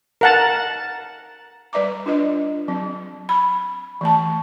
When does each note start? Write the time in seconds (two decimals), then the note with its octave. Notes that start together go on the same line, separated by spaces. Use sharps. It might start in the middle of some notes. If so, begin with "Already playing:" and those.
0.21 A#4 F#5 A5
1.73 G3 B4 D5 E5 A#5 D6
2.06 D4 F4 B4 D#5
2.68 F#3 C4
3.29 B5
4.01 E3 A3 A5